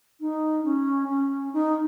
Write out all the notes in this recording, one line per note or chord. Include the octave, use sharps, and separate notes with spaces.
D#4
C#4
C#4
D#4